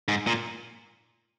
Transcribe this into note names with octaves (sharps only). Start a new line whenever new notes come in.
G#2
A#2